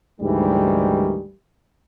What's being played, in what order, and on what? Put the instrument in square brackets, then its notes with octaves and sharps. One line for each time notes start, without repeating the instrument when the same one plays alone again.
[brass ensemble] D2 G#2 D#3 E3 G3